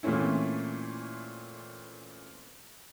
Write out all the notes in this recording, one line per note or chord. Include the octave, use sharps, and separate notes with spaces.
A#2 E3 A3 C4 C#4 E4